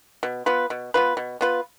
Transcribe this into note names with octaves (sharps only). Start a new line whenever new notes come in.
B2
B3 F4 B4
B2
B3 F4 B4
B2
B3 F4 B4